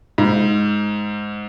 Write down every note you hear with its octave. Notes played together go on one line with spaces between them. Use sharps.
G#2